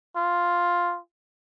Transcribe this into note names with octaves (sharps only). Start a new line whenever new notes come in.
F4